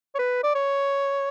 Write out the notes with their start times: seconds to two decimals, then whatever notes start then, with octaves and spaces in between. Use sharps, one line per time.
0.15 C#5
0.19 B4
0.43 D5
0.55 C#5